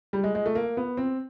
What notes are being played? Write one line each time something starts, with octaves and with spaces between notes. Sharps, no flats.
G3
G#3
G#3
A3
A#3
B3
C4